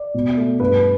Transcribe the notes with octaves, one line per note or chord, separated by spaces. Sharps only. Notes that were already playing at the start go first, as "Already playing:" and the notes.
Already playing: D5
B2
A3
G2 B4